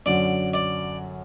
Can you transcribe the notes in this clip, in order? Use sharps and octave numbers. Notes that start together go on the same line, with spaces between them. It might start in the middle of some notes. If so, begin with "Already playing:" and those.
F#2 D3 F#3 D5
D5